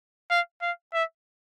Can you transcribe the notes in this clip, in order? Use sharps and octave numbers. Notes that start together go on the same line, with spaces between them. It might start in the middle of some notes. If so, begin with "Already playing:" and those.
F5
F5
E5